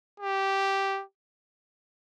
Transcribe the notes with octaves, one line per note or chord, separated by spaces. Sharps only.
G4